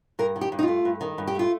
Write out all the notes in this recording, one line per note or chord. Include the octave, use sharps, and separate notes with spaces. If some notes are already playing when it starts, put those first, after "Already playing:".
G2 A#4
D#3
G4
G2
D#4
A3 F4
G2
D#3
G2
G4
A3 F4